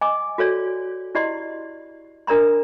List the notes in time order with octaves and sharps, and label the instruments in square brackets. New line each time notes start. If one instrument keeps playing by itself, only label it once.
[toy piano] D#5 G#5 D6
F#4 A4 C#5 D5
E4 G4 D5 D#5 C6
D4 A#4 D5 A#5 C6